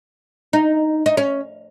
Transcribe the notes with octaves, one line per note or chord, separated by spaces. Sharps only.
D#4
D#4
C#4